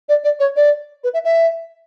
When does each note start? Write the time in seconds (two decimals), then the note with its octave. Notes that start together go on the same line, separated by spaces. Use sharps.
0.09 D5
0.24 D5
0.40 C#5
0.56 D5
1.04 B4
1.14 E5
1.24 E5